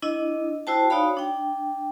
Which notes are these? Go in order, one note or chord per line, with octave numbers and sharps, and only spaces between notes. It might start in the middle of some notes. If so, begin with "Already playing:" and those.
D4 E4 D#5
E4 F#4 C5 G5 A5
D#4 F#4 C#5 D5 F5 B5
D4 G5